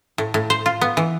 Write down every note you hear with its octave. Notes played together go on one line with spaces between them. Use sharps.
A2
A2
C5
F4
B3
E3